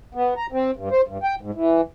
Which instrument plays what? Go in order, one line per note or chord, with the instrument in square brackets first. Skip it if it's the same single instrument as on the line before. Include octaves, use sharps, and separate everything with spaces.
[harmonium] B3
A#5
C4
G2
C5
G2
G5
G#2
E3